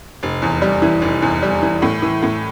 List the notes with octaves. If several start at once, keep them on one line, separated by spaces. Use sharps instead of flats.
F1
E2
G3
E3
F1
E2
G3
E3
A2
E3
A2